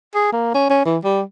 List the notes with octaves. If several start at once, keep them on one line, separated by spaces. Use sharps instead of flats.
G#4
A#3
C#4
C#4
E3
G3